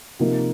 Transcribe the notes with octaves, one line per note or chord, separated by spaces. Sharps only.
C3 F3 A#3 D#4 A#4